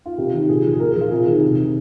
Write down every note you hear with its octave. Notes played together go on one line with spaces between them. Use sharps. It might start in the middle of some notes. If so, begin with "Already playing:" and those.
F4
C3 G4
D#3
A#2 G#4
F3
G#4
A#2 A#4
G#4
F3
F4
C3 G#4
D#3
C3
D#3